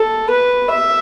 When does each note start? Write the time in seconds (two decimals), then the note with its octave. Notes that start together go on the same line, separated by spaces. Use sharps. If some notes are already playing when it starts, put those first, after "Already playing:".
Already playing: A4
0.30 B4
0.70 E5